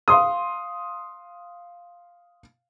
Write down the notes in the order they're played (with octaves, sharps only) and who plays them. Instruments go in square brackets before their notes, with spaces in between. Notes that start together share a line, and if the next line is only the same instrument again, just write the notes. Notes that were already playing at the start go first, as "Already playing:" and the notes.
[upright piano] F5 C6 D#6